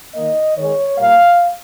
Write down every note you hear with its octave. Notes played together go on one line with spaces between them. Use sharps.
D#3 A#3 D#5
D#3 G#3 C#5
A#2 G3 A#3 F5